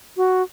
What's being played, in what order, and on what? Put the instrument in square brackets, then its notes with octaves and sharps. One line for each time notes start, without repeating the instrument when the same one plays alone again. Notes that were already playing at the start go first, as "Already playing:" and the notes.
[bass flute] F#4